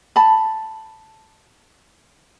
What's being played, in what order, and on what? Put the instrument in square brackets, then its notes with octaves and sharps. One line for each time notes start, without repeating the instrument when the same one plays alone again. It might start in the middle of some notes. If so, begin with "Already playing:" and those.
[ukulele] A5 B5